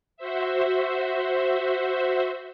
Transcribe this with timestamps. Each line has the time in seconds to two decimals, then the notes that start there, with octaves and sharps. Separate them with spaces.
0.17 F#4 C5 E5